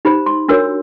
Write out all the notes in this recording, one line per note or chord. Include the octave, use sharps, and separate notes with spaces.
D#4 G4 C5 B5
C6
D4 F#4 A#4 C#5 E6